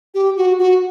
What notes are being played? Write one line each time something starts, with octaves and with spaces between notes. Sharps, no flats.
G4
F#4
F#4